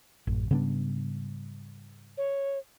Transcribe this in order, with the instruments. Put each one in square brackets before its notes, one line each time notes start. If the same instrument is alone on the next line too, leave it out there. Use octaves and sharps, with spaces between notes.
[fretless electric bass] A1 [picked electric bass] F#2
[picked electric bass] G#2 G3 [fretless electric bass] C#3 B3 D4
[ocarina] C#5